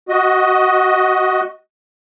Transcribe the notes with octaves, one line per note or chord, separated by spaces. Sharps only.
F#4 D#5